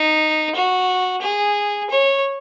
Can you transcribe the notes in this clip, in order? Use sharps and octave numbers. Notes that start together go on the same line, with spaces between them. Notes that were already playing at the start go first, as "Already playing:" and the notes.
Already playing: D#4
F#4
G#4
C#5